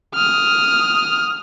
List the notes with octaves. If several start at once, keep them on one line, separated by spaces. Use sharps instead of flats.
D#6 F6